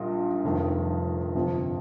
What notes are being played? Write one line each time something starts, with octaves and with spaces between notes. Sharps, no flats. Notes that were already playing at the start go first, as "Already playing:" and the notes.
Already playing: A#1 A#2 G3 D#4
F1 F2 D#3
G1 F2 C3